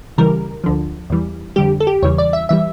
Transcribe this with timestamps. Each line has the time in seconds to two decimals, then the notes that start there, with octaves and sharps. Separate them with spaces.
0.18 C#2 C#3 E3 G3 A#4
0.64 D2 D3 F3
1.10 E2 E3 G3
1.56 F2 D3 G3 G4
1.80 A4
1.87 G4
2.02 E2 C#3 E3 G3 C#5
2.18 D5
2.33 E5
2.49 E3 G3 E5